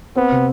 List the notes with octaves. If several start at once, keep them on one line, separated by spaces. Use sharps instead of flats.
B3 C4
C3